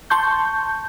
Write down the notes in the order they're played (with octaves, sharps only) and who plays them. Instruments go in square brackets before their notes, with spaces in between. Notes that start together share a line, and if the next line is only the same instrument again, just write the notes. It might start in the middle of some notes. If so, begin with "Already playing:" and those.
[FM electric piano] A5 C6 C#6 G6